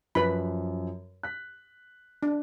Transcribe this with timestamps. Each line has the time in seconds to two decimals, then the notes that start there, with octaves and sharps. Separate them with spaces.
0.15 F#2 F3 B4 B5
1.23 F#6 B6
2.23 D4